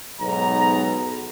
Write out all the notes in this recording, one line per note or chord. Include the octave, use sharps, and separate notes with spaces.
B1 G#2 B3 A#5